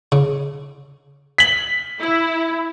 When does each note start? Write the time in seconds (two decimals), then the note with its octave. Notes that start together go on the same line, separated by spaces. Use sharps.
0.12 C#3
1.38 B6 F#7
1.99 E4